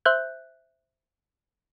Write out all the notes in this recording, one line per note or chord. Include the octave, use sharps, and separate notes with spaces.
C5 E5 F#6 G6